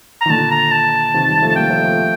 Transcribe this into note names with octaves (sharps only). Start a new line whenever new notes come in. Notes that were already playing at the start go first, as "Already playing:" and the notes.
A#5
D#3
A#2 D3 A5
A#5
A5
C3 D#3
D#3 G3
F3 A3
A5
G3 A#3 G5
F3 A3
F3 A3